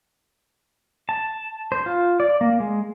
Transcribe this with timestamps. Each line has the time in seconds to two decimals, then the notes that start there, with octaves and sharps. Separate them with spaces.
1.09 A5
1.72 C5
1.86 F4
2.20 D5
2.41 A#3
2.60 G#3